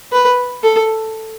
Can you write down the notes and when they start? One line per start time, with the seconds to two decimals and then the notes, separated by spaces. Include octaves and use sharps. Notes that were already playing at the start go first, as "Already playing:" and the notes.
0.12 B4
0.63 A4